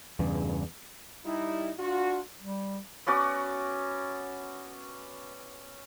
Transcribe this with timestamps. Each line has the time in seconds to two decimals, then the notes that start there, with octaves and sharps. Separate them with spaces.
0.19 E2 G2 C#3
1.25 G3 D#4 E4
1.79 D4 F4 F#4
2.40 G3
3.07 B3 C#4 F#4 D5